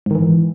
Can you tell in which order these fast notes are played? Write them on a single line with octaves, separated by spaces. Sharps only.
G#2 D#3 E3